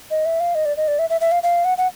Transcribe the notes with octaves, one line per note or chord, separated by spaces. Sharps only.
D#5
E5
F5
D#5
D5
D#5
D5
E5
E5
E5
F5
F5
F#5
F#5